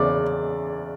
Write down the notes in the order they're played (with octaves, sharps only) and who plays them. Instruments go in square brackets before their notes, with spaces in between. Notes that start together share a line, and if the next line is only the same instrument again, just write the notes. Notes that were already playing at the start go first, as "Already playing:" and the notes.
Already playing: [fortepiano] E2 C#3 D5